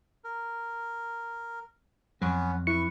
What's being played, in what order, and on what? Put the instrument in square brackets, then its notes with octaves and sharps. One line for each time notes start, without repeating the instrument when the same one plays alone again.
[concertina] A#4
[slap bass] F2 F#3 [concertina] B3 C#4 B4
[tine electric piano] E4 C#7 [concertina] B4 C#6